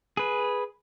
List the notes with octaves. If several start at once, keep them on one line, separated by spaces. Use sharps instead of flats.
G#4 B4